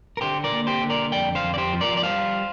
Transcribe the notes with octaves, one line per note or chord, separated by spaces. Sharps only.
A#4
D3 G4 C5
A#4 D5
A#3
G4 C5
D3
A#4 D5
F2 D5 G5
C5 F5
F2
D5
G4 C5
F3
A#4 D5
D5
G3 C5 F5